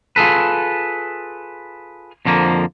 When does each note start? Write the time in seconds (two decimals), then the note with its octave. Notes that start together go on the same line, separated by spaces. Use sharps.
0.16 F4 G#4 A4 B4
2.26 F2 D3 F3 A#3